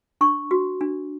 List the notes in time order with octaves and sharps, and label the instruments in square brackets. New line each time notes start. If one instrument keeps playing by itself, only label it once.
[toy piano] D4 C#6
F#4
D4